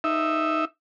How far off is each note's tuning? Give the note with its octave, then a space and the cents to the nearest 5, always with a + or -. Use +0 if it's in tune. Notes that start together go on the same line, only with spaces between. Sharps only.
D#4 +0 E5 +0